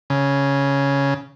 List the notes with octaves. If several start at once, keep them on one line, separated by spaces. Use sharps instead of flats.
C#3